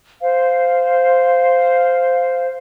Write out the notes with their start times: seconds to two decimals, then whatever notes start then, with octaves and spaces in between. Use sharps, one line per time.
0.21 C5 F5